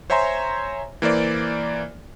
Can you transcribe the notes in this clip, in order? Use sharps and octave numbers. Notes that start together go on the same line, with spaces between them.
C5 C#5 E5 G#5 A#5 C6
E3 A#3 C5 D5